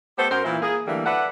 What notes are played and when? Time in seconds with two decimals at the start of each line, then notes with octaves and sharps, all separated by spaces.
0.18 A3 B3 G4 C5
0.31 F#2 A#4 C5
0.44 A#2 E3 E4
0.61 A#3 G#4
0.86 D3 E3 G3 A3 A#3
1.05 A4 B4 D5 E5 F#5